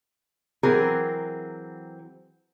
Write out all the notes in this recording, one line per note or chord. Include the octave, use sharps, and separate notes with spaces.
E3 F#3 C4 G#4 A#4